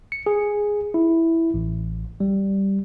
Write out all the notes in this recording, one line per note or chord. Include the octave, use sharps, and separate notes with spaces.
C#7
G#4
E4
A1
G3